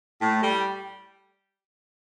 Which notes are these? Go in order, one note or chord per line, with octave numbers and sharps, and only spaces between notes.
A2
G3